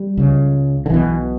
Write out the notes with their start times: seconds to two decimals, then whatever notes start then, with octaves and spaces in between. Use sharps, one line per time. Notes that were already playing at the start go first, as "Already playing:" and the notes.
Already playing: G3
0.17 C#2 C#3
0.86 D3
0.90 B1 B2 E3